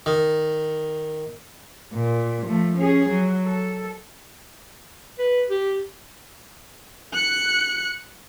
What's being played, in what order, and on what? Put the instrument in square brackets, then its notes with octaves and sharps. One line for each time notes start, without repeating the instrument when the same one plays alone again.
[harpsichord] D#3
[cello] A#2
F3 A3
C#4 G#4
F#3
A4
[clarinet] B4
G4
[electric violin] F#6 C#7